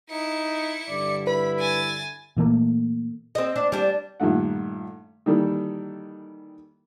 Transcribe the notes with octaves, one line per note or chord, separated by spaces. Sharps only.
D#4 E4 C#7
G2 D3 D5
E4 B4 B5
G#5 A6
A#2 E3 A3 A#3
C4 D#5
D4
G3 D4
G2 A#2 D#3 A3 F#5
D#3 E3 G3 A#3 A4